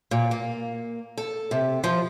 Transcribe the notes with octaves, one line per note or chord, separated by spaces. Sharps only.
A#2
A#3
A4
C3
F3